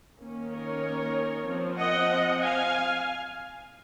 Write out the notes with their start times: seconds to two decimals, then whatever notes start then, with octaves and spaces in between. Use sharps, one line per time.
0.20 D#3 A#3 C#4
0.51 A#4 C#5
1.47 F3 C4
1.79 D#5 F#5
2.42 F5 G#5